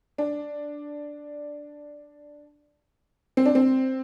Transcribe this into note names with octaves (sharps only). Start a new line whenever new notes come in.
D4
C4
D4
C4